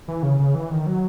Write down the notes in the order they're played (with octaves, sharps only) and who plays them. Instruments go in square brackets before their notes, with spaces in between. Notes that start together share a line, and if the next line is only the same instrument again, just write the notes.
[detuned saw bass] E3
C#3
C#3
E3
D#3
F#3